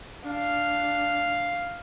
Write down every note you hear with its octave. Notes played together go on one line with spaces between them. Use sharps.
D4 F5